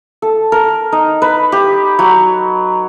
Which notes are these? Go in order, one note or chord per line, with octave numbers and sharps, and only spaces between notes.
A4
A#4
D#4
B4
G4
F#3